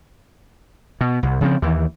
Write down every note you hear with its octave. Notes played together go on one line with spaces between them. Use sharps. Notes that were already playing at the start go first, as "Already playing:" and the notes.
B2
C2
C#3 F3 C4
D#2 E3